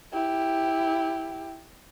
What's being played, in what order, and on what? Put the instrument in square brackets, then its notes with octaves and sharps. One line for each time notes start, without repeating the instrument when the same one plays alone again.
[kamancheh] E4 G4